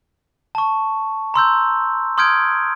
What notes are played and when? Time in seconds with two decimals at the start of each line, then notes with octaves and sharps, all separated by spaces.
0.55 A5 C#6
1.34 A#5 C6 E6 G6
2.18 C6 D#6 F6 G6 G#6 D7